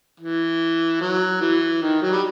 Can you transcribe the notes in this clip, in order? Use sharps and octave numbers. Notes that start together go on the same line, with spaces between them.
E3
F#3
E3
D#3
F#3
G3